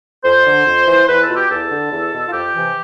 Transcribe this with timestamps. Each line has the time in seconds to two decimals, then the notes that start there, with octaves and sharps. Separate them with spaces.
0.25 F2 C5
0.46 D3
0.66 F2
0.87 E3
1.09 E2 B4
1.22 A4
1.29 B2 F4
1.36 G4
1.50 E2 A4
1.71 D3
1.92 E2
2.13 B2
2.27 F4
2.33 F2 G4
2.55 C3 E3